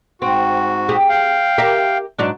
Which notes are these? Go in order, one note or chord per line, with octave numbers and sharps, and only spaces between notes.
G#2 C4 F#4
G4 G#4
F5 G5
G4 A#4 E5
G#2 F#3 D4